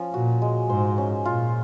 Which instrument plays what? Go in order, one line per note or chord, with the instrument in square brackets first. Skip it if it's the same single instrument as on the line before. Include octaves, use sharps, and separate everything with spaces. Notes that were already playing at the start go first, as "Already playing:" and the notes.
Already playing: [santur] F3 C#4
[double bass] A#2 [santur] F#4
[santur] G#3
[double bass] G#2 [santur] C5
[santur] C#4
[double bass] A#2 [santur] F4